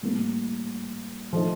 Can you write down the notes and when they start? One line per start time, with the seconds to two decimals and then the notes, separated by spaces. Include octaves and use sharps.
0.03 A2 G3 A#3
1.33 F3 A3 D#4